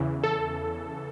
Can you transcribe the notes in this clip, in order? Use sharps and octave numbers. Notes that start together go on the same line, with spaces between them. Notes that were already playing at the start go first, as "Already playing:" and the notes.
Already playing: E2 C#3 E3
A4